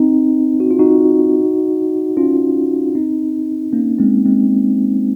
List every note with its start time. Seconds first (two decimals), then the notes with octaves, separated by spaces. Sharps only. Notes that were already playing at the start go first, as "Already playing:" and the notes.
Already playing: C4 D#4
0.60 F#4
0.71 F4
0.79 D#4 F#4
2.17 C#4 F4
2.95 C4 D#4
3.73 A#3 C#4
3.99 G#3 C4
4.26 G#3 C4